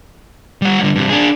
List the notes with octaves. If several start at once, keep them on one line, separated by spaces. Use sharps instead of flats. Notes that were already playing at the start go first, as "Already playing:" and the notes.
G3 F#5
G2 D3
G2 C3
D4 G#4